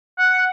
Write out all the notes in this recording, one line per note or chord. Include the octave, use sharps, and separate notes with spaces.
F#5